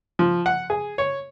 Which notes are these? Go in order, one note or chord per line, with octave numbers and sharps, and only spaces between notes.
F3
F#5
G#4
C#5